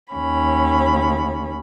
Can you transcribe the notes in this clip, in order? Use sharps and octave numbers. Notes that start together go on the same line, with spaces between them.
D#2 C#4 B5